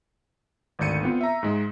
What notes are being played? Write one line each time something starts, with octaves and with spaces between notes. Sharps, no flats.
G#1 D2 D5 G6 C#7 D#7
B3 C4 F4
E5 A#5
G#2 G#3